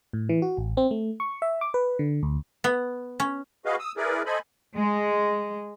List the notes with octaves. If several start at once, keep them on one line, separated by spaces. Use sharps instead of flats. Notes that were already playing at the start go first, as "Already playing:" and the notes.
A2
E3
F#4
A1
C4
A3
C#6
E5
D6
B4
D3
D2
B3
C#4
F#4 G#4 B4 D#5 F5
D#6 E6
E4 G#4 A#4 B4 D5
A4 C5 D#5 G#5 B5
G#3